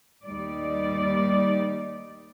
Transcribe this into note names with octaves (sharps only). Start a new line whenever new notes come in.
D#2 G3 D#4 D5